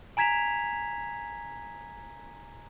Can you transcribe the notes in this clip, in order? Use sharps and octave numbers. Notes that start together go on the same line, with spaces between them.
G#5 A#5 G#6 B6 E7 F7